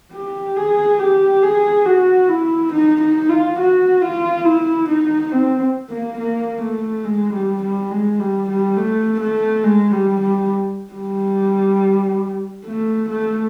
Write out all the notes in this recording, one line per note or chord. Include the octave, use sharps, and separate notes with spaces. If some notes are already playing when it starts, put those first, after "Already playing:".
G4
G#4
G4
G#4
F#4
E4
D#4
D#4
F4
F#4
F4
E4
D#4
C4
A#3
A#3
A3
G#3
G3
G3
G#3
G3
G3
A3
A3
G#3
G3
G3
G3
A3
A3